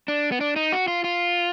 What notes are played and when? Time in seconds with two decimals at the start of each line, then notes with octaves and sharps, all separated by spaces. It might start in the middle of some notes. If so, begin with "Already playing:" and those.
0.08 D4
0.32 B3
0.41 D4
0.56 D#4
0.72 F#4
0.88 F4
1.04 F4